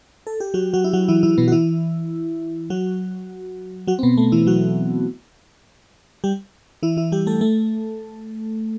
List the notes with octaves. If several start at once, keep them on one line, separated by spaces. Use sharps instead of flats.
A4
G4
F#3 F#4
F#3 F#4
E4
F#3 F#4
E3 E4
E3 E4
B2 B3
F#4
E3 E4
F#3 F#4
F#3 F#4
C4
B2 B3
A3
E3 E4
F#3 F#4
G3 G4
E3 E4
E3 E4
G3 G4
A3 A4
A3 A4